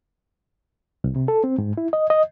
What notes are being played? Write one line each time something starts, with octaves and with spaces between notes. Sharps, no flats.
C2
C3
A4
C4
G#2
E4
D#5
D#5